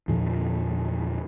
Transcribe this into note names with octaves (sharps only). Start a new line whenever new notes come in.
E2 A#2 D3 F3